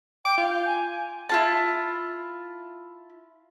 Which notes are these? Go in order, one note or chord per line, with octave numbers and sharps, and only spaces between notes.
G5 D6
F4
G6
G#5
E4 F4 A5